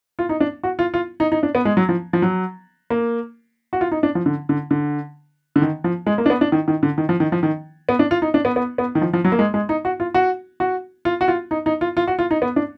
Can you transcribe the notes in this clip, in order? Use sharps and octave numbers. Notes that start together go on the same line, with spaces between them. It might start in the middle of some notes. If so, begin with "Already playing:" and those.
F4
D#4
D4
F#4
F4
F4
D#4
D#4
D4
B3
G#3
F#3
F3
F3
F#3
A#3
F#4
F4
D#4
D4
F3
D3
D3
D3
D3
D#3
F3
G#3
A#3
D4
B3
D4
D#3
D#3
D3
D#3
F3
D#3
F3
D#3
B3
D4
F4
D#4
D4
B3
B3
B3
D#3
F3
F3
F#3
A#3
G#3
G#3
D#4
F#4
F4
F#4
F#4
F4
F#4
F4
D#4
D#4
F4
F4
F#4
F4
D#4
B3
D4